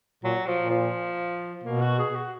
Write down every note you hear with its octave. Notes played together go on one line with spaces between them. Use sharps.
A#2 F#3
F3
A#2
F3
B2 A#3
F#4
G#4
F#4